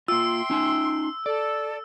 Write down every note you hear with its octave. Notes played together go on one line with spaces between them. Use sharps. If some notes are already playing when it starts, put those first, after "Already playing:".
A#3 F4 E5 G5 C6 E6
C#4 D#4 G#5
A4 D5